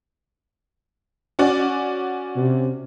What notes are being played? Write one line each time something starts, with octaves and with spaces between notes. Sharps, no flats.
C#4 F#4 D5
C3